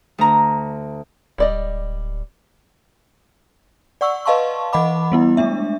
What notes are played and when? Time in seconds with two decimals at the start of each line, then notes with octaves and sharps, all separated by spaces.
0.18 D2 A#5
1.38 D1 G3 D5 D#5
4.01 D5 F#5 C#6 E6
4.25 B4 D#5 F5 A5 C6 C#6
4.73 E3 D#5 F#5 B5 D6
5.12 G3 B3 E4
5.37 G#3 A3 D4 E5